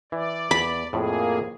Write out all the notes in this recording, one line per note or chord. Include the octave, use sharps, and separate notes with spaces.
E3 D5
E2 B5
F2 A2 A#3 G#4